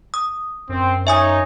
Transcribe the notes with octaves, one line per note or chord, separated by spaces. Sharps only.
D#6
F#2 C4
D#4 C#5 E5 G#5 D#6